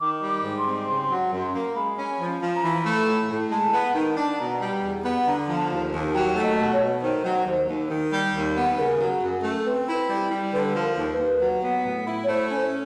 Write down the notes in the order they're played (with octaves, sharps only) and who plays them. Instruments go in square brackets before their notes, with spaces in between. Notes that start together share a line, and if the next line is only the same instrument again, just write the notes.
[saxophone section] D#3 [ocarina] D6
[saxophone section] G3
[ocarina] D6
[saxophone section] G#2
[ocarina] C6
[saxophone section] C4
[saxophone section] C#3 [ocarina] C6
[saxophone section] F#3
F#2
A#3
[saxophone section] G#3 [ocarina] B5
[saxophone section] C#4
F3
F3
[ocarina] A#5
[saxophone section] E3 [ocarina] B5
[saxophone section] A3
A2
A2
[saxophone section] G#3 [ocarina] A5
[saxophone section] B3
D#3
D4
[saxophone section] B2 [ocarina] A#5
[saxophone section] G3
E2
B3
[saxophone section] D3 [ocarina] A#5
[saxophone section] F3
[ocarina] A5
[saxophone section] D#2
D#2
[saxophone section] F#3 [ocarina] G5
[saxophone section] A3
[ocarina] D#5
[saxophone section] B2
[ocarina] C#5
[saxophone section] B2
[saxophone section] D#3 [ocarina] C5
[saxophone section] F#3
D#2
D#2
D#3
G3
D#2
B3
[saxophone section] C#3 [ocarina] A#4
[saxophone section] F#3
F#2
A3
[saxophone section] C4 [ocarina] B4
[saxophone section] E4
G3
G3
[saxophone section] D3 [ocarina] B4
[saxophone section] F3
[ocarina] A#4
[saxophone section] D#2
[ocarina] B4
[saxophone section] D#2
F#3
B3
A2
E4
[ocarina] C#5
[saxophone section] A3 [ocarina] C5
[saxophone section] C#4